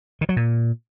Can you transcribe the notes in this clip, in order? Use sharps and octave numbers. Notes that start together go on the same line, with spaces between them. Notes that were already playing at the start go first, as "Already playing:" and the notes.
D#3
F#3
A#2